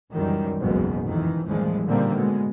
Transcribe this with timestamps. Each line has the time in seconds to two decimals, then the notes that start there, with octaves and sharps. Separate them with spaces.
0.12 C#2 F#2 D#3 E3 G3
0.59 F#1 B1 E2 G#2 B2 G#3
1.04 F2 D#3 E3
1.47 A1 D#2 E3 F3 G3 G#3
1.86 A#2 D3 D#3 G3 A#3 C4
2.14 B2 G#3